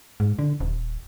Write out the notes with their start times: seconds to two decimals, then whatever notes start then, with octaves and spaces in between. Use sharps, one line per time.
0.20 G#2
0.39 D3
0.60 D#1